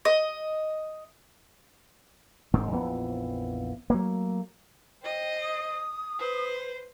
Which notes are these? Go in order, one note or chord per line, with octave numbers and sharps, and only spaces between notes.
D#5
E1 G#2 D#3 C4
A#1 F2 E3 B3
F#3 A3 A#3
C5 D#5 G5
D#6
B4 C5